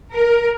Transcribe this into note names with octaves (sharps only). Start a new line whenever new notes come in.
A#4